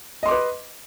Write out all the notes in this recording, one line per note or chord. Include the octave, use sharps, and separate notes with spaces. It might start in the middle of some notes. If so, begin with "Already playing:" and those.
B4 D#5 C6 D6